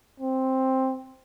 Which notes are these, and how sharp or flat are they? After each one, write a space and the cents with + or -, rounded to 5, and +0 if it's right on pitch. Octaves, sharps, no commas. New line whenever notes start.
C4 +5